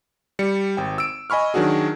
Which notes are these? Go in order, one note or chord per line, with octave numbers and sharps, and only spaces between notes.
G3 C#7
G#1 G5
E6 D7
D#5 G#5 B5 C#6 F6
D#3 F#3 D4 F#4 G#4